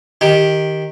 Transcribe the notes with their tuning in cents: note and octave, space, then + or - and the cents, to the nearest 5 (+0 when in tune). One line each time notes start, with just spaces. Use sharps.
D#3 +0 G4 +0